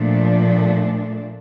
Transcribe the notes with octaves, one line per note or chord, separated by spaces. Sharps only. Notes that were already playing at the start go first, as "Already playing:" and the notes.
Already playing: A#2 F3 A3 D4